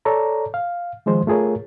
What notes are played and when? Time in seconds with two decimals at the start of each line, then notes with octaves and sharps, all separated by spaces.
0.05 A4 C#5 D5 A#5
0.54 F5
1.06 D#3 F3 G#3 C5
1.27 A3 F4 G#4 A#4 C#5